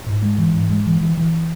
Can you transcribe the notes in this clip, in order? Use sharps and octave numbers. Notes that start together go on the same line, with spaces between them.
G#2
G#3
E3
G#2
G#3
E3
E3
E3